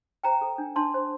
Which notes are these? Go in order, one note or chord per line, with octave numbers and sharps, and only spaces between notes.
C5 G5 A#5
A4
D4
D4 A5 C6
C5